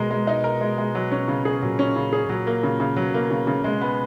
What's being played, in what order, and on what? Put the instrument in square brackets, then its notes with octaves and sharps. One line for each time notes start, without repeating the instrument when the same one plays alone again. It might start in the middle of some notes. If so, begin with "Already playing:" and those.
Already playing: [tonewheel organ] B2 [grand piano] G#3 A#4
[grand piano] G#3
D#4
A#4
G#3
G#3
F#3
C#4
C#3
G#4
[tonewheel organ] A#2 [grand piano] F#3
[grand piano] C#4
C#3
G#4
[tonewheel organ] A#2 [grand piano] F#3
[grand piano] A#3
C#3
C#3
[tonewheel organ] B2 [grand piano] F#3
[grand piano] A#3
C#3
C#3
[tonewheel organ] B2 [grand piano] G#3
[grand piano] B3